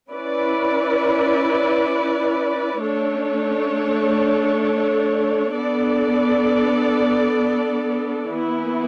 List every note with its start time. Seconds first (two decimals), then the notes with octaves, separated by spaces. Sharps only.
0.11 C#4 E4 B4 D5
2.83 A3 D4 A4 C#5
5.55 B3 D4 A4 D5
8.29 E3 B3 E4